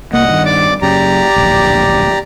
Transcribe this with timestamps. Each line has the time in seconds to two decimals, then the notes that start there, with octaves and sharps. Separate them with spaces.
0.13 C2 A#3 D#5 F#5
0.28 G2 D#3
0.45 D5 D6
0.82 F#2 C#3 G4 D5 A#5
1.36 D1 A#1